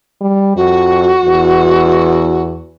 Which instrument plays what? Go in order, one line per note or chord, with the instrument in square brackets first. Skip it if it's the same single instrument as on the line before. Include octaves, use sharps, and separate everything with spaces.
[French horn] G3
[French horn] F2 [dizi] F#4
[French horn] E2